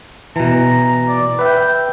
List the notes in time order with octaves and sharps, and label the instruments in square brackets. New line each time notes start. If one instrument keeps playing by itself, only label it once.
[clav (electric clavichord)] B2 E3 [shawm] A#5
[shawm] D5
[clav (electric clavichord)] B4 E5 [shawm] G5